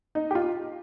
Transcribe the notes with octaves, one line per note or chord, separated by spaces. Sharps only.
D#4
G4
F4